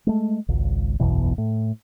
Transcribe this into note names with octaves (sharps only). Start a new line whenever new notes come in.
G#3 A3
G#1 C#2
F#1 B1 E2 B2
A2